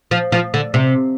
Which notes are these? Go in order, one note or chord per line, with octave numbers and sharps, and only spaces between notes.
F3
F3
D3
C3